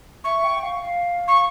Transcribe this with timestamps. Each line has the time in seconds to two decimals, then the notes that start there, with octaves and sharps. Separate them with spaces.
0.24 E5 C#6
0.44 G5
0.63 F5
0.82 F5
1.28 C#6